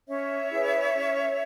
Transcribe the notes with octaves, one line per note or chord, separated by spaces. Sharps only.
C#4 C#5 E5
E4 G#4 B4
C#4